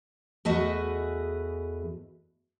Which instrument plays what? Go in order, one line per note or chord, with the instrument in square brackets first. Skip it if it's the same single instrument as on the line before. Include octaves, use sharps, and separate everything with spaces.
[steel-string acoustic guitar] E2 A3 F#4 G#4 B4 D#5